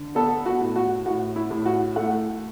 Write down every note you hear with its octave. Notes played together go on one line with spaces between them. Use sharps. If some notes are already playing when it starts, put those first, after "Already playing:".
Already playing: D3
B3 A4
F#4
A2
F#4
A2 F#4
E4
A2
F#4
A3 F#5